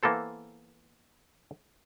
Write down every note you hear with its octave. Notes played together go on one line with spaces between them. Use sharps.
E3 A#3 B3 A4 C5